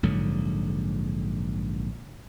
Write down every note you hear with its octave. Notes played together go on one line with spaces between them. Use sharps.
A#1 G#2 D3 F#3